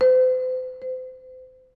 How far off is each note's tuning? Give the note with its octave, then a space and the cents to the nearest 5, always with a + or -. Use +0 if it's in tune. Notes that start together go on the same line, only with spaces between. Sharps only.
C5 -40
C5 -30